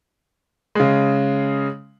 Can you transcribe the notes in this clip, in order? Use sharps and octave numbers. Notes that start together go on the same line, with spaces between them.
C#3 G#3